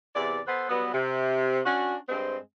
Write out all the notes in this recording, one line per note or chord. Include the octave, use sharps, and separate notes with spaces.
E2 C3 D5
B3 A4 B4 C5
F#3 G3 B3
C3
C#4 D4 F#4
G2 G#3 C4